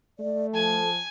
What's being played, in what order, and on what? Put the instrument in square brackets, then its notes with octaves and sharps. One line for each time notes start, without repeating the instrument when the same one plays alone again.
[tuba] A3 [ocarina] D5
[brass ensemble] F3 A5 [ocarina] A4 [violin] G#5 G#6